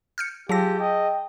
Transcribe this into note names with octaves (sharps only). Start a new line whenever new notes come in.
F6 G6 C#7
F#3 F4 G4 G#4 A5 E6 A#6
D#5 G5